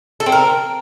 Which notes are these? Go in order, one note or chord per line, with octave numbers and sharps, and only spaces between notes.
A4
C4
A#4